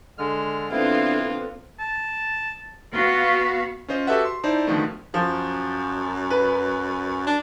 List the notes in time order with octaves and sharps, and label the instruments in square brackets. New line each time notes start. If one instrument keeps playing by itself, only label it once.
[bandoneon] D3 G#3 F6
[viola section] D3 B3 [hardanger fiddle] C4 F4 [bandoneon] E4
[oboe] A5
[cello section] B3 F#4 F5 [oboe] F4
[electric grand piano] C#4 F4 C5 D#5
F#4 G4 A4 B4 E5 F#5
C6
D#4 E4 C5 D5 A5
B2 D3 D#3 F3 A3
[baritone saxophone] F#2 [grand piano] F3
[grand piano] B4
[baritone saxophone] D4